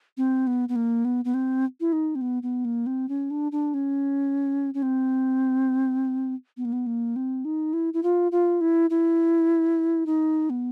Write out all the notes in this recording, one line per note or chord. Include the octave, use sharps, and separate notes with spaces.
C4
B3
B3
A#3
B3
B3
C4
E4
D#4
C4
B3
B3
A#3
C4
C#4
D4
D4
C#4
C#4
C4
B3
A#3
B3
A#3
C4
D#4
E4
E4
F4
F4
E4
E4
D#4
B3